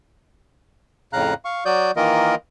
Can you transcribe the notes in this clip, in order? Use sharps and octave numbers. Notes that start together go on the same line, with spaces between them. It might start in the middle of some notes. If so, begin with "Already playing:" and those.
F2 A2 C#3 F5 A#5 F#6
F5 C#6
F#3 F#4 D5 D#6 G6
D#3 E3 A#3 F4 A#4 D#5